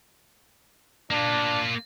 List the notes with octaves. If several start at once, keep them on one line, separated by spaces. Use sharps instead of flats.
A#3 D4 F4